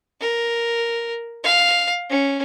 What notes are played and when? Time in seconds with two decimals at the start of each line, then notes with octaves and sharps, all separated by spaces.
0.20 A#4
1.43 F5
2.10 C#4